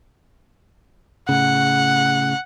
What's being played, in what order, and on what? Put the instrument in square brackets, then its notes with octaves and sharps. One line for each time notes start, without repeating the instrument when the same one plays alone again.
[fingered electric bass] A2 C#3 [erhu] F#5